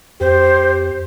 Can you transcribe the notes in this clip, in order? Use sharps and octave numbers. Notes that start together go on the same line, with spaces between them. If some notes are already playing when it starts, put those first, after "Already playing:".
F2 G4 C5